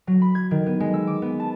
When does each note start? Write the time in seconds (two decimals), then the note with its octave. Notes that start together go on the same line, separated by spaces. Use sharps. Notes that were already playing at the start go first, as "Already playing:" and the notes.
0.07 F#3
0.22 B5
0.35 G#6
0.51 D#3
0.66 B3
0.80 G#3
0.94 E6
1.07 D6
1.22 B3
1.40 A5